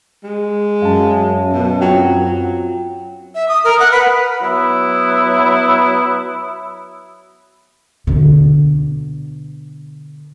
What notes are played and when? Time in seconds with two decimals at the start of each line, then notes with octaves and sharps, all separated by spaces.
0.24 G#3
0.82 F#2 F5 A5
1.52 B2
1.81 F#3 C4 F4 G5
2.19 F#3
3.35 E5
3.49 D#6
3.64 A#4
3.80 F#5
3.92 B4
4.42 F#3 B3 E4
8.07 B2 D3